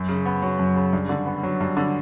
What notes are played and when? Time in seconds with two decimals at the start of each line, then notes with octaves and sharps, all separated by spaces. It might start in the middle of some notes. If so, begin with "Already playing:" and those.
Already playing: F#2
0.09 C#3
0.26 B3
0.42 F#3
0.59 F#2
0.76 C#3
0.93 G2
1.09 D3
1.26 B3
1.43 F#3
1.61 G2
1.77 D3